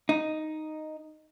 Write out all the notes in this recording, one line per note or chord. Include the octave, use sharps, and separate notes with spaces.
D#4